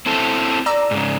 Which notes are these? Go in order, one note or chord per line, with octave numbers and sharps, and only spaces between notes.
C4 E4 A4
D5 A#5 E6
G#2 C#3